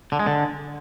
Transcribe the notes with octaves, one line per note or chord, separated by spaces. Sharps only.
D3
G#3
D3